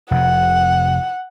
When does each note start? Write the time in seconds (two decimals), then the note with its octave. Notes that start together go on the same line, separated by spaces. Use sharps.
0.11 F1 C3 F#5